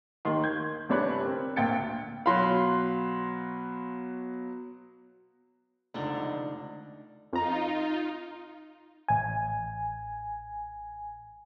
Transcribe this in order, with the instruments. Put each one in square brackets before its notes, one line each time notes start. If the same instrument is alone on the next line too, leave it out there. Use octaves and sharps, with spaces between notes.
[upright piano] D#2 D#3 C6
G6 G#6
G1 C3 D4 C#5 B5 F#6
C4 A#4
D2 A#2 G5 A6 C#7
[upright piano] B2 F#3 B5 [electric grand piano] F5 C6
[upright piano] F1 C#2 [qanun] D3 D4 D#4
[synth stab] F2 A#5 [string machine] D#4 F4
[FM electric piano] A1 G#5